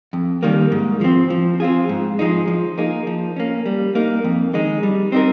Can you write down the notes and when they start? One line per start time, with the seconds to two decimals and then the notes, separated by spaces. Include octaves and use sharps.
0.13 F2
0.43 D#3 G3 A#3
0.72 G#2
1.01 F3 C4
1.30 F3
1.60 C4 F4 G#4
1.89 G#2
2.19 F3 G#3 D#4
2.48 F3
2.78 A#3 D#4 G#4
3.07 F3
3.36 A#3 C#4
3.66 G3
3.95 A#3 D#4
4.24 F2
4.53 D#3 G#3 D#4
4.83 G3
5.12 C4 D#4 A#4